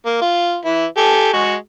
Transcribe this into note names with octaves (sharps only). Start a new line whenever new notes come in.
A#3
F4
E3 E4
G4 A4 G#5
G#3 F#4